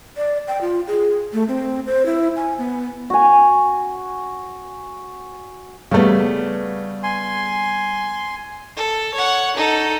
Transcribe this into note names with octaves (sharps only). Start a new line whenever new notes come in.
D5
G5
F4
G#4
A3
C4
C5
E4
G#5
B3
F#4 G#5
C#3 G3 A3 B3
G#5 C6
A4
C#5 F#5
D#4 A4